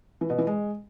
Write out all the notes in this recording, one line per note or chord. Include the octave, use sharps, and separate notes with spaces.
E3
B2
E3
G#3